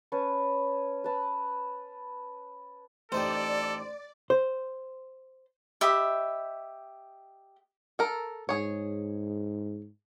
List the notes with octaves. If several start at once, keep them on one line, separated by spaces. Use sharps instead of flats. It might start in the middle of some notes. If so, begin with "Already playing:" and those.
C#4 B4 A5 C#6
B4 A5 B5
A1 D#4 G4 A4 C5 D5
C5
G4 D#5 E5 B5
A4 A#4
G#2 G#4 C#5